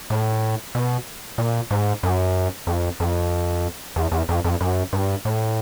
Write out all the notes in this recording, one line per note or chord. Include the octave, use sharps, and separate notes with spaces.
A2
B2
A#2
G#2
F#2
F2
F2
E2
E2
F2
F2
F#2
G2
A2